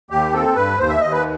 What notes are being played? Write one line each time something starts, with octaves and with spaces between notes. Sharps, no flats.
D#2 G4
C4 A4
G2 B4
D#2 C5
E5
D#2 D#5
B4